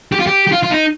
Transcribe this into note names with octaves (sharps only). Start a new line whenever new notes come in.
G4
F4
G4
G4
F4
F4
D#4